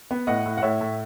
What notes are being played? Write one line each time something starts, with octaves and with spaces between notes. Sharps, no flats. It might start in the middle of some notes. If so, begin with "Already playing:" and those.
B3
A2 D#5 F#5
A2
F#5
A2 C#5 E5
A2